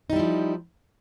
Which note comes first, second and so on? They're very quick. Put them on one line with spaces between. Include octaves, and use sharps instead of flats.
D#4 G3 E4 F3